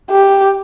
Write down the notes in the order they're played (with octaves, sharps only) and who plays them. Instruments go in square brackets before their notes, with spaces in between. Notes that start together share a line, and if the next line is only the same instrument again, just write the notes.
[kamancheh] G4